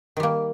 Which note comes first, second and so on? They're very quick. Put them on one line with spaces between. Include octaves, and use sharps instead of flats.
D#3 G3 A#3